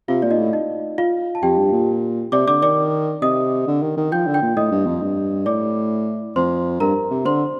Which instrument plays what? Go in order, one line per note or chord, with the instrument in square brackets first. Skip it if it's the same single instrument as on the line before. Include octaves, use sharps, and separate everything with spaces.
[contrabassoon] C3 [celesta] F4 F5
[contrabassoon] A#2 [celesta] D5
[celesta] D#4 D#5
[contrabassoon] A2
[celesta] D#4 D#5
F4 F5
A5
[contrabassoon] F2 [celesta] G4 G5
[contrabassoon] G2
A#2
[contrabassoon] C3 [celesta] D5 D6
[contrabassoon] D3 [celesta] D5 D6
[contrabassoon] D#3 [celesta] D5 D6
[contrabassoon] C3 [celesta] D#5 D#6
[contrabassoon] D3
D#3
D#3
[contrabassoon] F3 [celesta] G5 G6
[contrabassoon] D3
[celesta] G5 G6
[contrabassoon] A#2
[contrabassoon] A2 [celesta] D#5 D#6
[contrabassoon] G2
F2
G2
[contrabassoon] A2 [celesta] D5 D6
[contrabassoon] F2 [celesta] C5 C6
[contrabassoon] G2 [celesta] A#4 A#5
[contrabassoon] C3
[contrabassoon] D3 [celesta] C5 C6